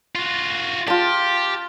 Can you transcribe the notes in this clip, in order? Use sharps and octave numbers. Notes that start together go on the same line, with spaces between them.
F4 F#4
F4 G4 A5